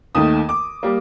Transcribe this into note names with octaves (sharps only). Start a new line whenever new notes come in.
D#2 D#3 A3 D#6
D6
G3 A#3